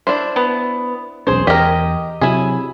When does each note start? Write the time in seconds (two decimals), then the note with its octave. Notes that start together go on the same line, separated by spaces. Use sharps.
0.07 D4 E4 C5
0.36 B3
1.27 E1 B1 C#4 G#4 C5
1.47 E2 G4 A#4 D#5
2.21 C3 F#3 E4 G#4